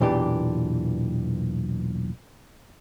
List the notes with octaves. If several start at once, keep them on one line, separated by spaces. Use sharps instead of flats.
B1 E2 A#2 E3 D4 G4